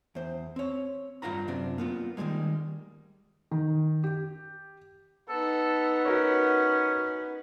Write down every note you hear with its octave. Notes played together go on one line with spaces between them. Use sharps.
E2 C5
C4 C#5
G2 F4 B4 F#5 A#5 B5
F#2 C3 D4
A#3 B3 F4
D#3 E3 G3 G#3 A#3
D#3
G4
B3 D#4 A4
C#4 F#4 A#4 C#5